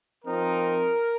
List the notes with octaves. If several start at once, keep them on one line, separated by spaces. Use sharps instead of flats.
F3 C4 D#4 A#4